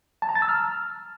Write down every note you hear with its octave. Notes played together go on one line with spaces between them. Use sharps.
A5
A#5
A6
E6
F6